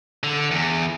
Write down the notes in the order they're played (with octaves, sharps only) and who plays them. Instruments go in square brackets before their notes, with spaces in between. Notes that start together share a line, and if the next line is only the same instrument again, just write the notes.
[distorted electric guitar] D3
E2